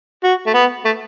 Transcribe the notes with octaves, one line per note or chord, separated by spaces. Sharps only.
F#4
A3
B3
A3